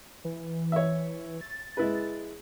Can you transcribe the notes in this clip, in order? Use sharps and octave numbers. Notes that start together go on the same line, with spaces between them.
E3
C#5 E5
A6
G#3 E4 B4